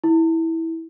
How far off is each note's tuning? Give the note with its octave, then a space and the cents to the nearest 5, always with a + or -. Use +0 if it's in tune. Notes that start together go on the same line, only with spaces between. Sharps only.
E4 -15